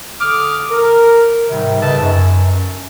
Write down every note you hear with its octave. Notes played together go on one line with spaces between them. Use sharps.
D3 D6 D#6 F6
A#4
G#2 C3 D#3 G3
G#2 C#3 B4 D#5 E5 A5
F#2